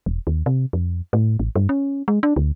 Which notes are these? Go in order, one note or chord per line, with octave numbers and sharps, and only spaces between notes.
E1
D#2
C3
F2
A2
A1
G2
C#4
G#3
D4
D2